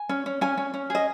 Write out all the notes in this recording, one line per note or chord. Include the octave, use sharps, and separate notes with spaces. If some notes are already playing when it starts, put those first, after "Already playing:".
Already playing: G#5
C#4
C#4
C#4 G#5
C#4
C#4
G#4 D#5